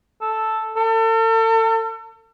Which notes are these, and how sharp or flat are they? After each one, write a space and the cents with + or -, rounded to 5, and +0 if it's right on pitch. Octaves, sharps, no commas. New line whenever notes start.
A4 +0
A4 +40